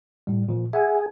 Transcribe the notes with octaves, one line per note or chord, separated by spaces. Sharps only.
A2 G3
A#2 F3
G#4 E5 F#5 G#5